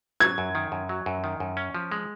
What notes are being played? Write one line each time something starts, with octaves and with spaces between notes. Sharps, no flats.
F#3 G#6
F#2
D#3
F#2
F#3
F#2
D#3
F#2
C#4
F3
G#3